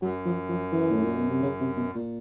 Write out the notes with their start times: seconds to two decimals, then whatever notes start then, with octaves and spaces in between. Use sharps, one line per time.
0.02 F#2 F#3
0.26 F3
0.49 F3
0.72 E3
0.91 A2
1.03 A#2
1.17 B2
1.29 C3
1.43 C#3
1.60 C3
1.77 B2
1.95 A#2